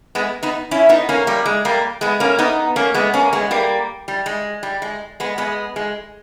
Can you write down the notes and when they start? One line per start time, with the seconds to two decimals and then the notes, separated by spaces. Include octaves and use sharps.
0.15 G#3 B3
0.43 B3 D#4
0.71 C#4 E4
0.89 B3 D#4
1.09 A#3 C#4
1.27 G3 A#3
1.46 G#3
1.65 G3 A#3
2.01 G#3 B3
2.20 A#3 C#4
2.39 B3 D#4
2.76 A#3 C#4
2.94 G#3 B3
3.14 A#3 C#4
3.33 G#3 B3
3.51 G3 A#3
4.08 G3
4.26 G#3
4.63 G3
4.82 G#3
5.20 G#3 B3
5.38 G#3 B3
5.76 G#3